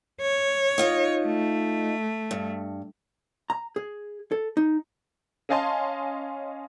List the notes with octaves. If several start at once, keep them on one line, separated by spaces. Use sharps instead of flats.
C#5
D#4 F4 D#5
A3
G2
A#5
G#4
A4
D#4
C#4 D#5 F5 G#5 A5 C6